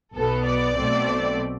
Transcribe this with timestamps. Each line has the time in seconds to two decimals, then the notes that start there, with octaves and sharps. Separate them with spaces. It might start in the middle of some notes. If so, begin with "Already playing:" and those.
0.16 B1 B2 B3 A4
0.46 D5
0.77 B1 B2 A3 C4